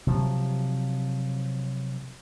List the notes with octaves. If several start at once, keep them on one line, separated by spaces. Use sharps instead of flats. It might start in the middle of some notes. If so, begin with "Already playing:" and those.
C3 F3 F#3